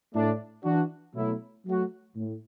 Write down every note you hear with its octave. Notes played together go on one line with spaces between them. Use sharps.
A2 A3 D4
E3 D4 F#4
B2 F#3 A3 E4
F#3 A3 F#4
A2